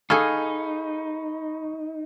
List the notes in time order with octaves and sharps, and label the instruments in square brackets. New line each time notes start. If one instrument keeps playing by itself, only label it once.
[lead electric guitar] D#4 [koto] G#4 A4 [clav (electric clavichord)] F5 G#5 [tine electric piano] B5 C#6